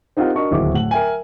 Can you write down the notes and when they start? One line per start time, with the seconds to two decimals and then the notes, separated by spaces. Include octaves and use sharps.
0.17 C4 D#4 F4 G4 A#4 F#5
0.35 D4 F#4 A#4 D#5 C#6
0.51 D1 D#2 E4 F#4 G#4 D6
0.74 A2 F#5 F#7
0.91 A#4 E5 G5 G#5